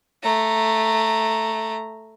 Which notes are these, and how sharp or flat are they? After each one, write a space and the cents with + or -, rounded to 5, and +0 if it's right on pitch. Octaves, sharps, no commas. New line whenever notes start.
A3 +0 A#5 -5